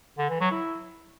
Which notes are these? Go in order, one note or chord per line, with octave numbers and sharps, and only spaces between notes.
D3
E3
F#3
E4